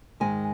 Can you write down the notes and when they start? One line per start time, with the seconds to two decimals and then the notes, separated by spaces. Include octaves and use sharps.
0.20 G#2 D#3 G#3 G#5